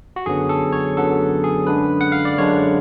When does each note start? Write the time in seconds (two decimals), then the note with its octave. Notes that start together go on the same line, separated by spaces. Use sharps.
0.16 F#4
0.26 F#2 D3 F#3 B3 G#4
0.49 A4
0.73 C#5
0.96 F#2 D3 F#3 B3 A4
1.44 G#4
1.67 F#2 D3 G#3 D4 B4
2.01 F#5
2.12 F5
2.25 D5
2.38 F#2 D3 G#3 D4 C#5